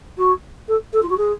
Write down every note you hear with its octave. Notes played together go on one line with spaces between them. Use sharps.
F#4
A4
A4
F4
F#4
G#4